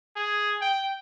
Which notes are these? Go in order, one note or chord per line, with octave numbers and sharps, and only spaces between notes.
G#4
G5